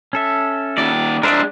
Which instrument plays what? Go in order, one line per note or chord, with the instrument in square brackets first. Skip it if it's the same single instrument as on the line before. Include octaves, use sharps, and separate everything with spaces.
[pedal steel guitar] C#4 A4 E5
[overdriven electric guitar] D#2 D5
[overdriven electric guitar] G#3 D4 [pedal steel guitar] A#4 C5 E5